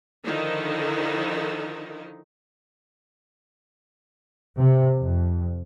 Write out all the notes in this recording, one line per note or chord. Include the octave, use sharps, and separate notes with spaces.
D3 D#3 F3 D#4 E4
C3
F2